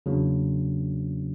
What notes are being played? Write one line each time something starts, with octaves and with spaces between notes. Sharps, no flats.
E2 C#3 F#3 A#3 D4